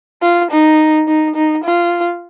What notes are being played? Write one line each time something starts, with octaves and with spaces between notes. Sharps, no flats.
F4
D#4
D#4
D#4
F4